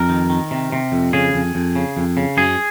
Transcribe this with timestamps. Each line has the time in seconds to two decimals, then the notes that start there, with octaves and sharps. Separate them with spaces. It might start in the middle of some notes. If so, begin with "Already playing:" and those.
Already playing: F2 A#4
0.09 D#3
0.30 D#3
0.51 C3
0.72 C3
0.92 F2
1.13 C#3 G#4
1.34 F2
1.55 F2
1.76 C#3
1.97 F2
2.17 C#3
2.37 F#2 G#4